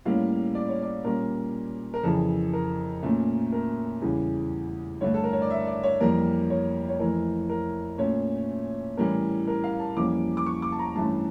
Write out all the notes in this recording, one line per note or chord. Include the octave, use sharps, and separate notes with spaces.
A2 G3 A#3 C#4 F5
D5
C#5
D5
A#2 G3 C#4 A#4
A#4
F2 C#3 E3 A4
A#4
A#2 A3 C#4
A#4
E2 C#3 E3 G3 C#4
G2 D3 A3 C#5
A4
A#4
C#5
D5
E5
D5
C#5
F2 E3 G3 A#3 A#4
C#5
C#5
F2 E3 A3 A#4
A#4
A#2 A3 C#4 C#5
A2 E3 G3 C#4 A#4
A#4
F5
A5
F2 E3 G3 A#3 C#4 D6
D6
C#6
D6
A5
A#5
G2 E3 A3 C#4 A5